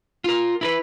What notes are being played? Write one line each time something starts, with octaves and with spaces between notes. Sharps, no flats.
F4 A#4
E4 A#4 B4